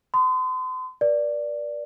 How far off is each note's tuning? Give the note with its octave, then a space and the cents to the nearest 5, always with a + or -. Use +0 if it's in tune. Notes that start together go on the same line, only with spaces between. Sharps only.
C6 -40 D#6 -20
A#4 +45 D5 +0